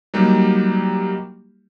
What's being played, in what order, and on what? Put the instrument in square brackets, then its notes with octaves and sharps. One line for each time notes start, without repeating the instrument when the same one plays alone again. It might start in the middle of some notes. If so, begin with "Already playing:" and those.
[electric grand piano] F#3 G3 A#3 D#4 G4